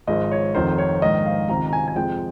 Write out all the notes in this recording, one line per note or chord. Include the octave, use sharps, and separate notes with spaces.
G#1 G#2 F3 G#3 D#5
C#5
F1 F2 C3 D#3 C5
C#5
A#1 G#2 D#3 D#5
F5
C#2 C3 D#3 A#5
A#5
G#5
G#5
F2 C3 F3 G#3 G5